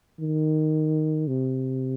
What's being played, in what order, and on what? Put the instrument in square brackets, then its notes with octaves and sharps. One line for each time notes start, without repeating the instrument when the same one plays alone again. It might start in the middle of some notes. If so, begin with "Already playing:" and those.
[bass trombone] D#3
C3